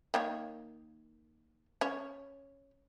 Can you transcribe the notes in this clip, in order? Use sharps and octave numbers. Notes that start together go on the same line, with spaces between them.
D#3 A#3 C#5
C#4 C#5